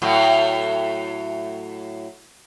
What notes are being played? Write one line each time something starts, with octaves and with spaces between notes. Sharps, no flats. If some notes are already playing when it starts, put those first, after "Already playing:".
A2 F#3